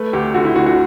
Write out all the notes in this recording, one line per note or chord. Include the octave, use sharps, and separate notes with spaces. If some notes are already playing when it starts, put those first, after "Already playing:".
Already playing: A3 B4
D2 G4
D3 F#4
E4
D2 F#4
F#4